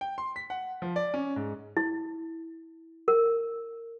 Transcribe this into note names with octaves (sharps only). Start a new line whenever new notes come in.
G5
C6
B6
F#5
F3
D5
C#4
G#2
E4
A#4